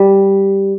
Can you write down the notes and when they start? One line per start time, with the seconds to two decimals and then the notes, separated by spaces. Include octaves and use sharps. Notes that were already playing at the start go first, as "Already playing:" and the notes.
Already playing: G3